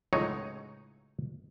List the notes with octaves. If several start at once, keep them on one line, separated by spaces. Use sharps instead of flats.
C#2 A2 F#3 D#4 C#5